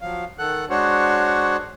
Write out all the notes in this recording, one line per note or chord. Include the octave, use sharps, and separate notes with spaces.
F3 F#3 F5
D#3 A4 F#5 F#6
G#3 D4 F#4 C5 C#5 F#5